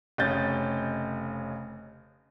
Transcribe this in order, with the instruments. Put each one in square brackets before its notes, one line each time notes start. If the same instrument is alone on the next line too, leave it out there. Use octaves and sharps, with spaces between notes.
[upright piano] F1 C#3 C#4 D#5 G6 A6